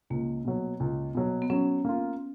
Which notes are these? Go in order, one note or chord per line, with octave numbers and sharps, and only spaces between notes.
C#2 A#3
B2 F#3
C#2
B2 F#3
B3
F#3 C#4
A#3 F4